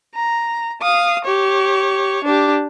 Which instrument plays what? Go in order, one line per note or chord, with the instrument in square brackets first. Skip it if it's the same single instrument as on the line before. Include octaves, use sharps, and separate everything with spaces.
[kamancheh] A#5
F5 D#6
G4 C#5
D4 G4